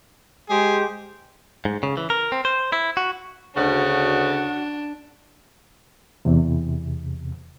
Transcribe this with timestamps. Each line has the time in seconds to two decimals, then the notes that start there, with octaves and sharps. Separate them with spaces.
0.49 G#3 G4 G#4 C5
1.65 G#2
1.83 C#3
1.97 E3
2.10 A#4
2.32 C4
2.45 C5
2.72 E4
2.97 F#4
3.57 D2 C#3 D4 F#4
6.25 E2 C3